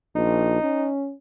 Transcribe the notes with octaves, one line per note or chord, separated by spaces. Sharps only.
A#1 D#4
C#4